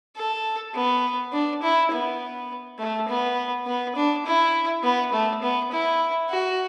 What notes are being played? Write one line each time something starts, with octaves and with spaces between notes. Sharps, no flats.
A4
B3
D4
E4
B3
A3
B3
B3
D4
E4
B3
A3
B3
E4
F#4